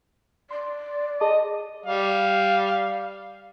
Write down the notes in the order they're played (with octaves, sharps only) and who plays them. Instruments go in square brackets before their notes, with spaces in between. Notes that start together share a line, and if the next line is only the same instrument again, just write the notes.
[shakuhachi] D5 [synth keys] C6
[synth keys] G#4 A5 D6 [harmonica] D#5
[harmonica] G3 F5